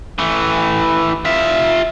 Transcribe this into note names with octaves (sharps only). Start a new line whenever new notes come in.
E3 A3
F4 E5